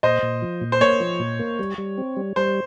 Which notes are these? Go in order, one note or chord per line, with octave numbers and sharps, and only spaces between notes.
A#2 C5 D#5
A#2
F3
A#2
C5
A#3 C#5
F3
A#2
A#3
G3
G3
C4
G3
G3 C5